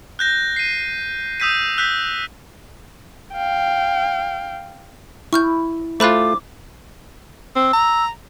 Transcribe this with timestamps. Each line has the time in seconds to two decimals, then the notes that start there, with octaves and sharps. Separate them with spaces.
0.19 F#6 G6 A#6
0.56 C7 D#7
1.40 D#6 E6 G6 B6 D#7
1.77 E6 F#6 G6 B6
3.34 F5 G5
5.33 E4 C#6 F6 G6
6.00 A3 F4 C5 B5 D6 F#6
7.56 C4 E6
7.73 A#5